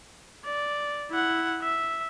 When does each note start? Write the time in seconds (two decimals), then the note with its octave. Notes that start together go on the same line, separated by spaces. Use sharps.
0.45 D5
1.11 E4 F#5
1.62 E5